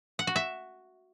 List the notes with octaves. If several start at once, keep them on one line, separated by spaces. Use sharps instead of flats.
F#5
F#4
E5